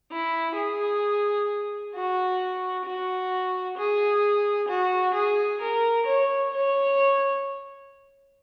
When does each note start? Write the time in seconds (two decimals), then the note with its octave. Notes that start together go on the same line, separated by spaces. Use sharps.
0.10 E4
0.56 G#4
1.93 F#4
2.85 F#4
3.77 G#4
4.69 F#4
5.15 G#4
5.61 A#4
6.06 C#5
6.52 C#5